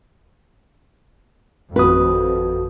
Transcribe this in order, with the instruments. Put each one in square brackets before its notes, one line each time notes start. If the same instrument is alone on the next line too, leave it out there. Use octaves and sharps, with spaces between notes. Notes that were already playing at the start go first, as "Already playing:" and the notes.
[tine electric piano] G#1 F#4 D#6 [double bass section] F2 [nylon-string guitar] B4